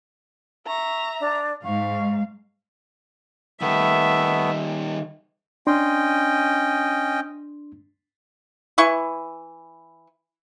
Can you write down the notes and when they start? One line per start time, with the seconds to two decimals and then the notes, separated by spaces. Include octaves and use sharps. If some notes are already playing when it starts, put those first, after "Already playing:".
0.67 E5 A#5 C#6
1.19 D4
1.64 G#2 F5 C#6
3.61 D#3 G3 A3 B3 E5
5.67 C#4 D4 D#5 G5 C6
8.78 E3 E4 C#6